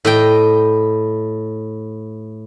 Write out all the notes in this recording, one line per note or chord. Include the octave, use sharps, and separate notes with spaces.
A2 D#5 G5